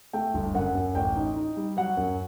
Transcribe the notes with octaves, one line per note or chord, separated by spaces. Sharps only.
A3 G5
G1
F#2 F#5
F#2
A1 G5
D#4
D#4
G3
F#3 F#5
F#2